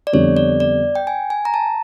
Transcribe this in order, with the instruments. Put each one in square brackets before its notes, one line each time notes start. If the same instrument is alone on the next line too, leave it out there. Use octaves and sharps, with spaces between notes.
[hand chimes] D5
[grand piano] F2 D3 G3 B3 D4 [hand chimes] C#5
[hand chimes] D5
D5
G5
G#5
G#5
A#5
A5